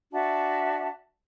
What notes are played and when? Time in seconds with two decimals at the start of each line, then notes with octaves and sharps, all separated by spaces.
0.12 D4 F#4 E5 A5